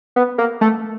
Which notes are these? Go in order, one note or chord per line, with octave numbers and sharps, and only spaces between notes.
B3
A#3
A3